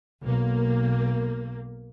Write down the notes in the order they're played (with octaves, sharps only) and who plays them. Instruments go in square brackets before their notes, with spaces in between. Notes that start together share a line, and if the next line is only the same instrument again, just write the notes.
[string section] B1 A#3